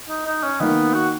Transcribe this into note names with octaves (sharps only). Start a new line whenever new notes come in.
D#4
D#4
C#4
D#3 A#3 B3 D#4
F#4